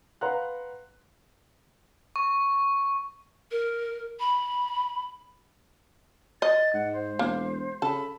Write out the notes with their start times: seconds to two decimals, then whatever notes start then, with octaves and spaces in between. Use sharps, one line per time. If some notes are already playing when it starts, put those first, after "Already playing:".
0.21 B4 F5 F#5 A#5 C6 F#6
2.16 C#6
3.51 A#4
4.20 B5
6.42 D#5 A6
6.73 G#2 F#5
6.93 C5
7.19 E1 A#3
7.82 C#3 A4 B5